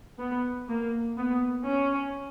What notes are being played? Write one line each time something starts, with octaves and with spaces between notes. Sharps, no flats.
B3
A#3
B3
C#4